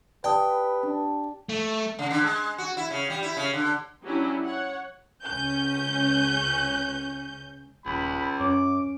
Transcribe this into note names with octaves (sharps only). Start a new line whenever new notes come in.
G4 B4 D5 G5 A5 D#6
D4
A3
C#3
D3
G#3
F#4
E4
C#3
G3
E4
C#3
D3
F#3 C#4 D4 E4 G4
C#5 F#5
C#2 C#4 G6
D#1 C#2 B5
F#2 C#4 D6